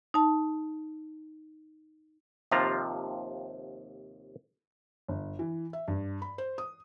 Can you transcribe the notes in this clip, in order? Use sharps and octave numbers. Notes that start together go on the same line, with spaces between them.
D#4 A5
D#2 C3 F3 F4 F5 A#5
G1
E3
E5
G2
B5
C5
D#6